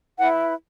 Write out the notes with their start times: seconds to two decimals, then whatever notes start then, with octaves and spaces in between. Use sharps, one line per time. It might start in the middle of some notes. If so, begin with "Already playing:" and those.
0.18 E4 B4 F#5